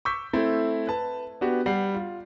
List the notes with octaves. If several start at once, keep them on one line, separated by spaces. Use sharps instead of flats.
C#6 D6 E6 G6 B6
A3 C4 E4
B4 A5
B3 D4 F#4 G4
G3 F#5 C7
F4